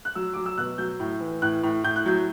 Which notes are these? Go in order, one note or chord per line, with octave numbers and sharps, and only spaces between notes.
F#6
F#3 E6
F#3 D6
E6
B2 F#6
F#3 G6
A2
E3
A2 F#6
A2
A2 G6
F#6
F#3 G6